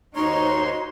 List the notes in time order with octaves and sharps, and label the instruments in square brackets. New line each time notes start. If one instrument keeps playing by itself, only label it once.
[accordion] D#2 C#5 C6 [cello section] D#4 [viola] F#4 C5 [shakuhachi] A#5